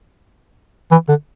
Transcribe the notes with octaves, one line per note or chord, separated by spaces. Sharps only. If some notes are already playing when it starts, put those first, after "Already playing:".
E3
D3